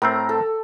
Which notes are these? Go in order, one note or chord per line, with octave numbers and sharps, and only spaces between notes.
A2 A3 C4 A#4
A4